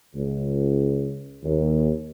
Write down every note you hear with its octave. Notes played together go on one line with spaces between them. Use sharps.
C#2
D#2